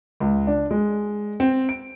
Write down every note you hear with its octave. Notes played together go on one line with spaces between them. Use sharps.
C#2
D4
G#3
C4
D7